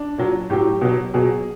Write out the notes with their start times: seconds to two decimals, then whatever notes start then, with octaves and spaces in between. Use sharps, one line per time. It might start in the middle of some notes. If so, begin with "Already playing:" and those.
Already playing: D4
0.18 A#2 F#3
0.50 A2 F#3 G4
0.81 B2 F#3
1.14 B2 F#3 G#4